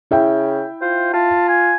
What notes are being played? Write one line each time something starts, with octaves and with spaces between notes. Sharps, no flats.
C#3 E4 E5 G5
F4 C5
F4 A5
G#5